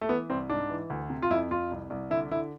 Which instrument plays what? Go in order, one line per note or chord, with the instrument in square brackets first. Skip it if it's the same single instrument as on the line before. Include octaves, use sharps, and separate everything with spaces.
[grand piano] A3
E3 B3
C2 C4
G#2 D4
E3
D2
C3
F4
F2 E4
F2 F4
C2
C2
D3 E4
D3 E4